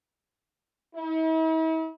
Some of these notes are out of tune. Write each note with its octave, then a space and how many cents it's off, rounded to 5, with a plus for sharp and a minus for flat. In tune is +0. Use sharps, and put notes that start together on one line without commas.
E4 -45